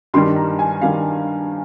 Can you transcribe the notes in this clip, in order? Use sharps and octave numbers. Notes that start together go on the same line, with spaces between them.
G2 D#3 G3 C6
A#5
G#5
D#3 G3 F5